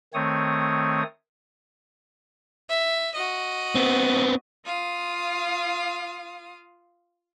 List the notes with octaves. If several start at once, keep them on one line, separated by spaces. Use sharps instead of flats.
D#3 A3 C4 C#5 D#6
E5
F#4 D#5
B3 C4
F4 F5 D#6